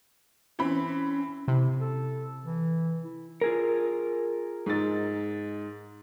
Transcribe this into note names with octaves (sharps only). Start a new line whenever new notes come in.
E3 C4 C#4 B5
C#4
C3 E4
A4
E3
E4
F4 G#4 A#4
G#2 A6